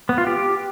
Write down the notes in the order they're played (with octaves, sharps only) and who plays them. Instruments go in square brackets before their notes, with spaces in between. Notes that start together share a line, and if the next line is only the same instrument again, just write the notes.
[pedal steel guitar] B3
F4
G4